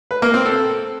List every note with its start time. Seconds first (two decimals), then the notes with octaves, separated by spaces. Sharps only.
0.11 B4
0.22 A#3
0.34 C4
0.46 A4